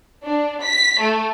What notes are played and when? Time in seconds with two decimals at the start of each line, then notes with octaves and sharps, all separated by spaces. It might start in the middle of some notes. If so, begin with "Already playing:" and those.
0.25 D4
0.64 B6
1.02 A3